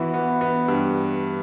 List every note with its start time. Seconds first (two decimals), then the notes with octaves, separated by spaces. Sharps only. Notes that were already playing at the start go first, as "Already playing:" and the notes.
Already playing: E3 B3 E4 F#4
0.14 B3
0.41 B3
0.68 G2